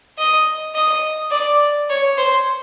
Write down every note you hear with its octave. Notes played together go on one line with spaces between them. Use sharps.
D#5
D#5
D5
C#5
C5